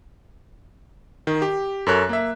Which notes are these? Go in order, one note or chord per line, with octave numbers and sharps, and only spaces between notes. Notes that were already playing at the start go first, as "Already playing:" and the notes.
D#3
G4
F#2 A4 A#4 C#5 F#6
A#3 E5